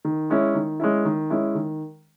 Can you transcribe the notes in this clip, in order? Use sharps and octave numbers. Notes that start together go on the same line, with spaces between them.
D#3
G#3 C#4 E4
D#3
G#3 C#4 E4
D#3
G#3 C#4 E4
D#3